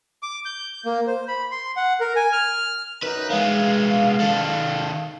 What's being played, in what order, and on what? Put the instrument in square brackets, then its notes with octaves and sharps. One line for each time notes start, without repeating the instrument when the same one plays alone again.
[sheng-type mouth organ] D6
G6
A#3
C5
B5
C6
F#5
A#4
G#5
F6
[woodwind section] F#2 D#4 [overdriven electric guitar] B4
[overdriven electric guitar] G#3 B3 [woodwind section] F5
[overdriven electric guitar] D#3 A4